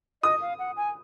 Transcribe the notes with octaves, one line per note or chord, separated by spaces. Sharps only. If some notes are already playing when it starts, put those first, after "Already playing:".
D#5 D#6
F5
F#5
G#5